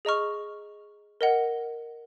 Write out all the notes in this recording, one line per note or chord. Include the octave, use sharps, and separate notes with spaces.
G#4 D#5 A#5 C#6 F6
A#4 D#5 F#5